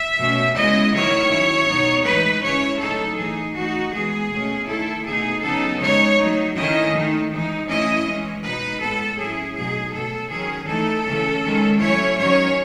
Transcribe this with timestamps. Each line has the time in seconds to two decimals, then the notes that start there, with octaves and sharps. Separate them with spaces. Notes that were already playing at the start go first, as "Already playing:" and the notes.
Already playing: E5
0.18 B2 A3 C#4
0.55 C#3 G#3 B3 E4 D#5
0.93 D#3 F#3 A3 E4 C#5
1.30 F#3 C#4 E4
1.68 B2 F#3 B3 D#4
2.05 A2 E3 G#3 D#4 B4
2.43 C#3 G#3 C#4 E4 C#5
2.80 A2 F#3 A3 D#4 A4
3.17 E3 A3 D#4 G#4
3.55 E3 A3 D#4 F#4
3.92 E3 G#3 B3 G#4
4.30 B2 A3 C#4
4.68 D#3 A3 E4 A4
5.05 B2 A3 D#4 G#4
5.42 C#3 F#3 B3 D#4 A4
5.80 C#3 G#3 D#4 C#5
6.18 F#3 A3 D#4
6.55 D#3 A3 C#4 E4 D#5
6.93 D#3 A3 D#4
7.30 E3 G#3 D#4
7.68 E3 A3 C#4 E4 D#5
8.05 E3 G#3 C#4
8.43 B2 G#3 D#4 B4
8.80 A2 G#3 B3 A4
9.18 F#3 C#4 E4 G#4
9.56 B2 F#3 A3 D#4 G#4
9.93 B2 F#3 A3 A4
10.30 D#3 F#3 C#4 G#4
10.68 E3 A3 D#4 A4
11.06 C#3 E3 A3 C#4
11.43 D#3 G#3 C#4
11.80 F#3 A3 C#4 E4 C#5
12.18 D#3 F#3 C#4 C#5